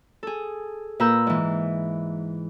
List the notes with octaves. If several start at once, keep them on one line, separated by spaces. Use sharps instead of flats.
G#4 A4
A#2 A#4 B4 A#5 E6 G6
G#2 E3